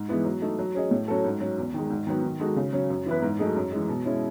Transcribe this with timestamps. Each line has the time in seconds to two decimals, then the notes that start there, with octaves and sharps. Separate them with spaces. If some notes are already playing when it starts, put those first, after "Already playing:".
Already playing: G#2
0.08 E3 G#3 B3 E4
0.25 F#3
0.42 A3 D#4
0.59 F#3
0.75 C#4 G#4 D#5
0.91 A2
1.08 F#3 C#4 F#4 A4
1.24 G#2
1.40 F#3 C#4
1.58 E2
1.74 D#3 G#3
1.90 G#2
2.07 D#3 F#3 B3
2.24 D#3
2.40 G#3 D#4 F#4 A4
2.56 C#3
2.73 F#3 C#4
2.90 F#2
3.06 E3 B3 E4 B4
3.22 G#2
3.39 F#3 A3 D#4 G#4
3.55 F#2
3.72 E3 G#3
3.88 B2
4.05 G#3 C#4 E4